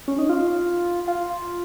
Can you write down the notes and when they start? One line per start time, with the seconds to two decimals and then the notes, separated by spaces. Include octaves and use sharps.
0.08 C#4
0.18 D#4
0.29 F4
1.08 F4